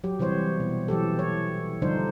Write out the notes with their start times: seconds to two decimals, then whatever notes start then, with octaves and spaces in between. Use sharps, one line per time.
0.04 F#3 G4
0.19 C3 E3 G3 C5 C#5
0.60 B2
0.88 E3 F#3 G4 A4
1.19 C#5
1.82 D3 F3 G3 D4 D#4 C5